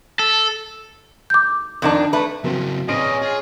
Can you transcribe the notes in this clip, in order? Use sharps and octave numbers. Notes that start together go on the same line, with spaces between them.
A4
D6 G6
F2 D#3 D4
A3 B4
C#3 F#3 A#3 C4 E4
A#1 C4 C#4 G#4 B4 D#5 D7
F4 G#4